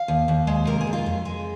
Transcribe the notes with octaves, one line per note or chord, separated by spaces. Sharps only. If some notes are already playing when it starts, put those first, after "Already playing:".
Already playing: F5
D#2
D#2
G#3
C3 A#4
G#4
F2
F4
F2
G#3